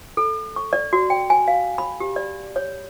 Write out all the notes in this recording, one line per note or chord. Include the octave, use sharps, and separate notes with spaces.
A4
C#6
D5
F#4
G5
G#5
F5
B5
G4
D5
C#5